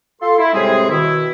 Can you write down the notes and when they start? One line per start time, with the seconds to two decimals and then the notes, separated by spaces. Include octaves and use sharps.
0.22 F4 A4 C6
0.39 E4
0.54 A2 C3 G3 G#3 C4 G#4
0.90 B2 D#3 E4